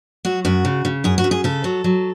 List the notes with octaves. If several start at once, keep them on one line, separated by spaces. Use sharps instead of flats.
F#3 F#4
F#2 F#4
C#3
C#3
F#2 G#4
F#4
F#2
G#4
C#3 A4
F#3
F#3